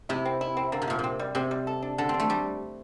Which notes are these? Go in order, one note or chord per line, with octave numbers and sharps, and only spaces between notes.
C3 E4
C4
E4
C4
D3 A#3
C3
A#2 F3
C3 C4
G3
C3 C4
G3
A4
D4
D3 A4
C4 D4
A3
G3 D4